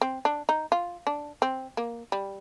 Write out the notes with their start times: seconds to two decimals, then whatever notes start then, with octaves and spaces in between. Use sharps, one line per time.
0.01 C4
0.25 D4
0.49 D#4
0.72 F4
1.07 D4
1.42 C4
1.77 A#3
2.12 G3